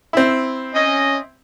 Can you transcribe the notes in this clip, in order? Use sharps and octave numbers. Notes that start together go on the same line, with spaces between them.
C4 E4
C#4 D#5